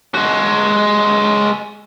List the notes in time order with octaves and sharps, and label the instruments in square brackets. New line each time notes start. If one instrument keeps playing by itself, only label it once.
[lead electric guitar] G#3 F#4